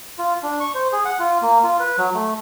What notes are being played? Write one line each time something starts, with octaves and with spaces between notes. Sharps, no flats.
F4
D4
C#6
C5
G#4
F#5
F4
A#3
F4
B4
F#3
A3